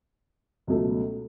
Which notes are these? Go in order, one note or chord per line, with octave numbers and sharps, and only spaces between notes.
C#2 B2 F#3 A3